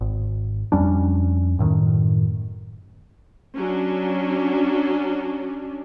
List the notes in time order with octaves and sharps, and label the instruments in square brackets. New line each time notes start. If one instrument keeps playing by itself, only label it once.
[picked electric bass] G#1
F2 G3 C#4 D4
F#2 A2 D#3
[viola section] F#3 C#4 D4